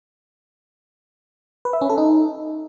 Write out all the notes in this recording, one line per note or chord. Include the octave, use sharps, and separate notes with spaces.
B4
E5
C#4
A4
D#4